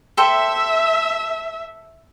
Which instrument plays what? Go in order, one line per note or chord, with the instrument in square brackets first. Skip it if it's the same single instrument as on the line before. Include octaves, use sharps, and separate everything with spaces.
[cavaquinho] A4 C5 G5 [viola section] E5